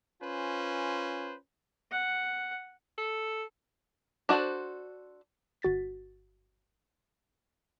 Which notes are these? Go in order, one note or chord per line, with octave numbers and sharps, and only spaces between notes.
C#4 F4 B4 C5 G#5
F#5
A4
D4 F#4 G#4 A4 C5
G1 F#4 A6 B6